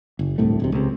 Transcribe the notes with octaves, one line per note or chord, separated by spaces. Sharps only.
F#1
D1 C2 A2 A3
D1 B1 C3
C#2 C3